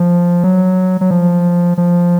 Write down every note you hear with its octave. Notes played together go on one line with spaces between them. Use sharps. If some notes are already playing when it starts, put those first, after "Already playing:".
Already playing: F3
F#3
F#3
F3
F3